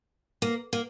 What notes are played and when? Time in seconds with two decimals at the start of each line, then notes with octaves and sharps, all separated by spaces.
0.42 A#3
0.73 A#3